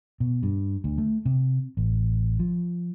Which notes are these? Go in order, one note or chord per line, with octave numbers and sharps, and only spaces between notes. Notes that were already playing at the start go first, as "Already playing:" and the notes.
B2
G2
D2
A3
C3
A1
F3